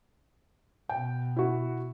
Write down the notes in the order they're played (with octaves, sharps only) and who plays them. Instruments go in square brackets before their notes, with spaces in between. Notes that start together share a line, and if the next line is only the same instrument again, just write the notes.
[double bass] B2 [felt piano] G5
[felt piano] E4 F#4